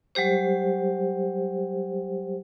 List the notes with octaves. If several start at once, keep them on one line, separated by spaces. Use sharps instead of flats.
F#3 G3 G4 C5